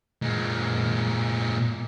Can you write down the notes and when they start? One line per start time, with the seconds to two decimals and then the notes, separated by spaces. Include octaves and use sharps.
0.22 A#2 G#3